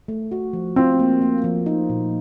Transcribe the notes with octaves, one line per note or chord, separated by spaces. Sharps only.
A3
F#4
F3
C4 F4
A#3
A#3
F3
D#4
A#2